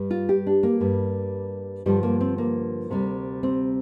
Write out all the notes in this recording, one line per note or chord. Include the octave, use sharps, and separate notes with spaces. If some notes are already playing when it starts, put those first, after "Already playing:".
Already playing: G2 G3
F4
G4
D4
A#3
G2 G3
G2 D3 F3 G3
A#3
C4
A#3
D2 C3 G3
C4